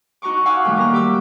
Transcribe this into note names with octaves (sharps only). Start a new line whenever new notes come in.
D#4 F#4 A#5 C#6 D6
F5 F#5 G#5 C#6 D6 E6
A2 D#3 F#3 G3 A3
G3 A#3 A#4 A#5
G4 D6 E6